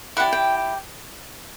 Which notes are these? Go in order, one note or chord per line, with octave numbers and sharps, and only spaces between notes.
E4 G4 D5 F#5
G5